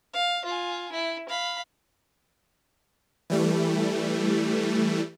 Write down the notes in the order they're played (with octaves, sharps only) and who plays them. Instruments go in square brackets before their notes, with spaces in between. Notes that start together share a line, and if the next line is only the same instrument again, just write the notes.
[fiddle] F5
F4 G#5
E4
F5 B5
[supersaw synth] E3 G3 A3